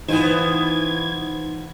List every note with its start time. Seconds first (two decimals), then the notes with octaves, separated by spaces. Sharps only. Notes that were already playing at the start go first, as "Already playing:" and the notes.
0.08 E3 B3 D#4 F4 C5 G#6